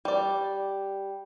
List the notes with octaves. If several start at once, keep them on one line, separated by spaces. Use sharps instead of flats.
G3 D5